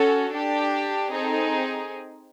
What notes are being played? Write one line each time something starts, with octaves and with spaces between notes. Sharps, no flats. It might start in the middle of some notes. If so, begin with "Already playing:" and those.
Already playing: C#4 F#4 A4
D4 G4
C4 D#4 G#4 A4